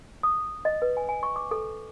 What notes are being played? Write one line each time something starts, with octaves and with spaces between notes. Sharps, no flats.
D#6
D#5
B4
G#5
G#5
C#6
D6
A4